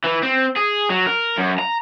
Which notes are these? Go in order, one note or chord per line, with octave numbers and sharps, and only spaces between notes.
E3
C4
G#4
F#3
A#4
F#2
A#5